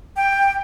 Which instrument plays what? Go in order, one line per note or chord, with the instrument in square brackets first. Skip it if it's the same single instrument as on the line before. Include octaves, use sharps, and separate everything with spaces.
[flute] G5